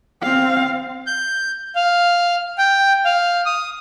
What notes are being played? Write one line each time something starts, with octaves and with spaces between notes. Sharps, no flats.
C4 F5
G6
F5
G5
F5
D#6